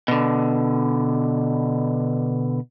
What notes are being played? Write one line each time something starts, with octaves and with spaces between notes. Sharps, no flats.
B2 D3